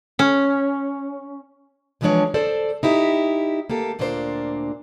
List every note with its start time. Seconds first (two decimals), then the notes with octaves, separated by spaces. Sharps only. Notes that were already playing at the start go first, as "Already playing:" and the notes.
0.19 C#4
2.01 D3 E3 F3 G#3 D4 C#5
2.34 A4 C5 D5 A5
2.83 D#4 E4 G4
3.70 A#3 G4 A4
3.99 D2 A#2 A#3 D4 F4 C5